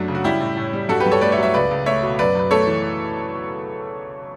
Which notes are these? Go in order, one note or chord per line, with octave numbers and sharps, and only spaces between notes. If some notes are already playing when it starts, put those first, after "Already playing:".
Already playing: F#2 F#3 A3 D4
C#3
F#4
G3 E4 G4
A2
A2
G3
G2 F#4 A4
G4 B4
G2
A4 C#5
A3 B4 D5
C#5 E5
F#3
C#5 E5
C#2 B4 D5
C#2
A3 C#5 E5
B2
F#2 B4 D5
F#2 B4
A3 A4 C#5
E3